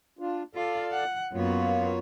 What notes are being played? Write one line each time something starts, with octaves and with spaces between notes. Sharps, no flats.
D4 F4
F4 A4 D5 F5
F#5
F#2 A#3 B3 F4 C#5